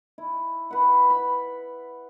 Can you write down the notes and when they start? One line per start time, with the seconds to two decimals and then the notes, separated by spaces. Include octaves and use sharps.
0.18 E4
0.71 B4 F#5
1.10 B5